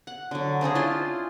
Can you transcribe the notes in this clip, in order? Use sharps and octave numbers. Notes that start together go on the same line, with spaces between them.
F#5
D3 F#3
C#3 C4 D4 G#4
E4 F4 C5 C6